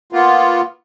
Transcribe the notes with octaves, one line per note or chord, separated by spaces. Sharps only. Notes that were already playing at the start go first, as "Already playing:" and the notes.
A#3 B3 F4